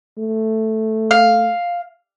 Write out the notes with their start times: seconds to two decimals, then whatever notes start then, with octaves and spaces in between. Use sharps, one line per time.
0.18 A3
1.11 F5